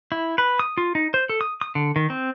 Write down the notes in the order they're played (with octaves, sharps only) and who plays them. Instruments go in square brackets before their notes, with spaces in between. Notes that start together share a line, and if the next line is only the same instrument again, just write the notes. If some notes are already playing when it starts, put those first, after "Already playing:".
[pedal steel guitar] E4
B4
D#6
F4
D#4
C5
A4
D#6
D#6
D3
D#3
C4